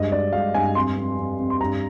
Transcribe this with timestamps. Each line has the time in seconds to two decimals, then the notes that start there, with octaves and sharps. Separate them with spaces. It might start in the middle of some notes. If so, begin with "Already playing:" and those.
Already playing: G2 G#3 D#5
0.12 G2 D5
0.33 G#3 F5
0.54 G2 G#5
0.75 F2 C6
0.97 F2
1.18 F2
1.39 F2
1.50 C6
1.60 G2 A#5